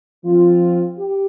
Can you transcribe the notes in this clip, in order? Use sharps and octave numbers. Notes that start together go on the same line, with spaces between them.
F3 C4 F4
G4